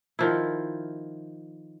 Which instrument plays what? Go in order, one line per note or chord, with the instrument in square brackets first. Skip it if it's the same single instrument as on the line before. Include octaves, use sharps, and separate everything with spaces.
[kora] D#3 F3 E4